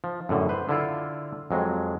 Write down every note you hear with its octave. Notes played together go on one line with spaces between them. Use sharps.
F3
F#2 A2 D3
B4 C5
D3 E4 F4
F2 F#3 G#3